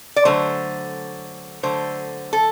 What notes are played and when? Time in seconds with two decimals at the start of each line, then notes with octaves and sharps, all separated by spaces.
0.16 D5
0.25 D3 F#3 A3 C5
1.63 D3 F#3 A3 C5
2.33 A4